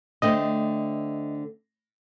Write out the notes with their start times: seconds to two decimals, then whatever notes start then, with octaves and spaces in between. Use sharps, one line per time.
0.22 D3 A3 C4 D#5